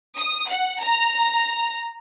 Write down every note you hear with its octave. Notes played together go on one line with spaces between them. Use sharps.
D#6
F#5
A#5